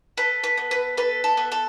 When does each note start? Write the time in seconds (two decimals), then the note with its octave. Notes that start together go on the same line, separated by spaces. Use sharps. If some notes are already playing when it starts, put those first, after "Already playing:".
0.18 A4 B4
0.44 B4
0.57 B3
0.71 B4
0.97 A4 B4
1.24 A4
1.37 B3
1.52 A4